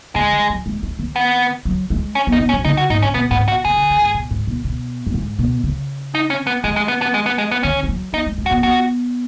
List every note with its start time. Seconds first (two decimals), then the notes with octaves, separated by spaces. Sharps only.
0.15 C#3 G#3
0.32 D#3
0.50 F#3
0.66 G#3
0.83 G#3
0.99 D#3
1.16 B3
1.65 F#3
1.90 G#3
2.15 C#4
2.27 B3
2.32 D#4
2.39 B3
2.49 C#4
2.53 F#3
2.65 C#3 D#4
2.77 F#4
2.90 G#2 D#4
3.02 B2 C#4
3.14 B2 B3
3.31 G#2 B3
3.48 B2 F#4
3.65 C#3 G#4
3.77 C#3
3.90 D#3
4.02 G#2
4.14 B2
4.31 G#2
4.47 B2
4.64 B2
5.06 F#2
5.14 G#2
5.39 B2
5.64 C#3
6.15 D#4
6.30 C#4
6.47 B3
6.64 D#3 G#3
6.76 G#3
6.88 B3
7.02 B3
7.14 G#3
7.26 B3
7.38 G#3
7.51 B3
7.63 D#3 C#4
7.83 G#3
7.88 F#3
8.13 B3 D#4
8.26 G#3
8.38 G#3
8.46 F#4
8.51 B3
8.63 B3 F#4